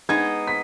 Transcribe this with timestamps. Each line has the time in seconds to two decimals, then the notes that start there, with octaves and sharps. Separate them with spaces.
0.09 G#3 B3 D#4 G#6
0.47 B6